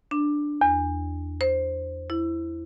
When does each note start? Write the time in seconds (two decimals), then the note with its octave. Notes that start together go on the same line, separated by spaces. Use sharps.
0.11 D4
0.61 E2
1.41 C5
2.10 E4